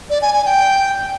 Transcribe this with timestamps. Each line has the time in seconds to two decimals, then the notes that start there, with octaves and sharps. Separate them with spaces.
0.10 D5
0.22 G#5
0.33 G#5
0.45 G5